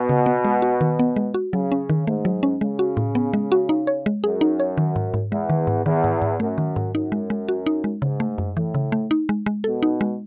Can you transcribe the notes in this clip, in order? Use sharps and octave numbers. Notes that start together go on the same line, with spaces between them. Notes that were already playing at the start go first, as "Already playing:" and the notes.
Already playing: B2
C#3
B3
G#3
F#4
D#3
B3
G#3
F#4
C#3 F#3
C#4
D#3
G#2 A3
F#3
C#4
C#3 G#3
F#4
A2
B3
G#3
F#4
D#4
C#5
G#3
F#2 G#4
D#4
C#5
D#3
G#2
G#2
E2 G#3
D#3
G#2
E2 D#3
G#2
G#2
F#2 A3
D#3
G#2
F#2 D#4
G#3
G#3
F#4
D#4
G#3
G#2 C#3
A3
F#2
A2 E3
C#3
A3
D#4
G#3
G#3
B2 A4
D#4
G#3